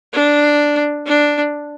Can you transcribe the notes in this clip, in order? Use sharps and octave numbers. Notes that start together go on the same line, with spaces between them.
D4
D4